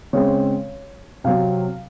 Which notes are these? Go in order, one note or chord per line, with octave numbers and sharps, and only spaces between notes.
C#3 G#3 C4 C#5
C3 F#3 C4 F5